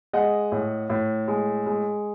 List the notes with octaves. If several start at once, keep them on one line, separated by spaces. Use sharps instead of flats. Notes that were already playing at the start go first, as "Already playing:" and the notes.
G#3 D#5 F#5
A2
A2
G#3
G#3